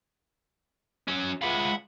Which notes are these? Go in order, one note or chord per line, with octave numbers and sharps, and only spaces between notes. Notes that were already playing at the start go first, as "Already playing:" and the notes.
F#3 C#4
G#3 F4 E5 F#5 B5